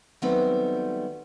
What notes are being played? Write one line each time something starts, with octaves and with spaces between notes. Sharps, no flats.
D#3 F#3 G3 A3 B3 C4